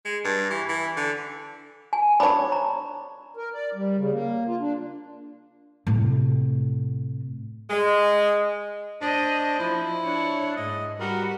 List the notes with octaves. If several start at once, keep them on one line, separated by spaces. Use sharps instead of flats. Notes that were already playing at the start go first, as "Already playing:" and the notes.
G#3
G2
E3
E3
D3
G#5
D4 C#5 B5
A#5
A#4
D5
G3
C#3
A#3
F4
D4
A2 C3
G#3
D4 C5 D#5
F3 E4
D4 C#5
G#2 D#5
G3 F#4 A#4 B4